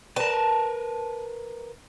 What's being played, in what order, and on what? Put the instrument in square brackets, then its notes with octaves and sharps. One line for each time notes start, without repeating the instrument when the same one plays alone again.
[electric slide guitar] A#4 B4 [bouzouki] A5